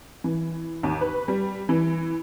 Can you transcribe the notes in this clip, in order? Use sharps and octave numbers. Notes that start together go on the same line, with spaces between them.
E3
D#2
B4
G3
E3